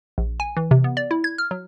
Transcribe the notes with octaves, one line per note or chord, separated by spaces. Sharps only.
A#1
G#5
E3
C3
B3
D5
E4
G#6
F6
F#3